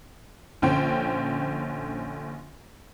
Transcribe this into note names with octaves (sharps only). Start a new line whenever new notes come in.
A#1 D3 C#4 C5 G5